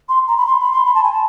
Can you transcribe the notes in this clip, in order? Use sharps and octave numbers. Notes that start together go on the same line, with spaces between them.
C6
A#5
B5
C6
B5
C6
B5
A5
G#5
A5